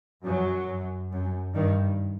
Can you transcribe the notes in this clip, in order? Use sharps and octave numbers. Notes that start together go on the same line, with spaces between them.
F#2 F#3
F#2
F#2
G2 D#3